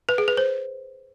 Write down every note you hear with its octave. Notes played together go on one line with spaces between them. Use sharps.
B4
G#4
B4
C5